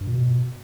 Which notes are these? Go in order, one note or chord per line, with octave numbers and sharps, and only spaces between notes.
G2
A#2
B2